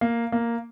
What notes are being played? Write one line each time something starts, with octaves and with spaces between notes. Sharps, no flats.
A#3
A#3